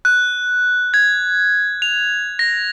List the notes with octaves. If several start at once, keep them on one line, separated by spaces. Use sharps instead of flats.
F#6
G#6
F7
A#6